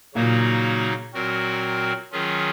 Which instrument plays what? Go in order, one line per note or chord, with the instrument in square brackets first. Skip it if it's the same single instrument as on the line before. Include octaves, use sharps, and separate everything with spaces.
[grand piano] A#2 [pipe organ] C#3 F#3 A#3 D#4 F#4
[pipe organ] A#2 F#3 C4 F#4 A#4
D#3 F#3 C#4 F4 G#4